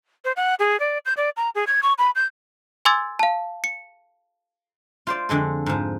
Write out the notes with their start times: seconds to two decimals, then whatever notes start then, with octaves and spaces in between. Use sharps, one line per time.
0.25 C5
0.36 F#5
0.59 G#4
0.80 D5
1.05 G6
1.17 D5
1.37 A#5
1.55 G#4
1.67 G#6
1.83 C#6
1.98 B5
2.15 G6
2.85 G#5 C6 D6 E6 G#6 A6
3.19 F5 A5
3.64 C#7
5.07 F4 C5 D5
5.29 F2 D3 G#3 A4
5.66 G#2 F3